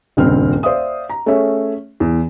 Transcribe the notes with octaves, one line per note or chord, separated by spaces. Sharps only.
D#1 C#2 G2 C4 F6
C5 D5 E5 F5 D#6
A#5
A3 C#4 G#4 C#5 E5
E2